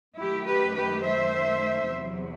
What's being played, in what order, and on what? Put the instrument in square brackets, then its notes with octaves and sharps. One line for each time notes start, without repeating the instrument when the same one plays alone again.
[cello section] F#2 D#3 A3 E4 G4
G4 B4
G4 B4
C5 E5
E2 C3 F#3